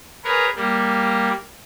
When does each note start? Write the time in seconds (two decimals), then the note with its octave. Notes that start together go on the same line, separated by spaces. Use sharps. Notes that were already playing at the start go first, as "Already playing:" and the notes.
0.24 G#4 A#4 B4 C#5
0.56 G3 A#3